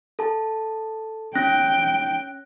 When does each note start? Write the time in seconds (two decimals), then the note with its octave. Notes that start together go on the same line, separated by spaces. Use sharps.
0.19 A4 A5
1.35 C#4 G5 F#6 A#6